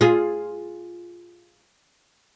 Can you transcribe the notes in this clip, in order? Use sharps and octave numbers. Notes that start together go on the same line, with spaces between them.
F4 G#4